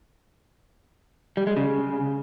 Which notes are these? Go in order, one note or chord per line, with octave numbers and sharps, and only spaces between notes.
G3
G#3
C#3